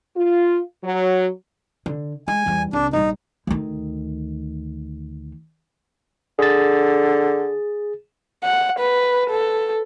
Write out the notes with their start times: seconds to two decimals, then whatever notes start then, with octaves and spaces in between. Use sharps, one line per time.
0.16 F4
0.84 F#3
1.86 D3
2.28 G#3 G#5
2.46 E2 G3
2.73 C2 D4
2.93 A#1 G3 D#4
3.47 D2 D#3
6.39 D3 G#4 A6
8.44 F#5
8.80 B4
9.31 A4